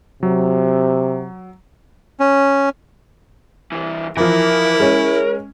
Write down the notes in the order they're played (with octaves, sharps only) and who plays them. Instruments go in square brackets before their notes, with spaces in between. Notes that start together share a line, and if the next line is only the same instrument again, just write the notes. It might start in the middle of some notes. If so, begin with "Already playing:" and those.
[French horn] C3 [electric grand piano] F#3
[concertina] C#4
[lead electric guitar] C2 E3
[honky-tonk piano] E3 F3 [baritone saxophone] E4 [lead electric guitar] A#4
[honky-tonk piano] G#3 C#4